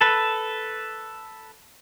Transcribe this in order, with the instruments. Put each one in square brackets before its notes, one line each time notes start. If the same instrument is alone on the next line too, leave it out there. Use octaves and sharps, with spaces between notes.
[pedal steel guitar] A4 B4